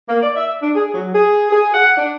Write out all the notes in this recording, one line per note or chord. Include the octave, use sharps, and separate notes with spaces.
A#3
D5
E5
D4
G#4
F#3
G#4
G#4
F#5
D4